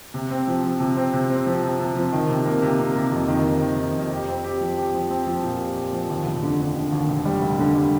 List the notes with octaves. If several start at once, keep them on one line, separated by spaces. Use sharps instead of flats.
C3
C4
F3
F3
C3
C4
C3
C4
F3
C3
C3
F3
D#3
C3
A#3
C3
A#3
C3
F2
D#3
D#3
D#3
D#3
F2
G4
C4
G4
F3
G4
F3
C4
F3
A#2
G4
G4
F3
D#2
F1
D3
D3
D3
D#2
F1
G3
F1
D3
G3